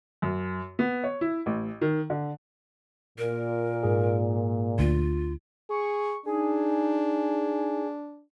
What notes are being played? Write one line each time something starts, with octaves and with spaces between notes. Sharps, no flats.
F#2
B3
C#5
E4
A1
D#3
D3
A#2 A#4
G#2 G#4
D2 F4
G#4 C#6
D4 D#4 G#4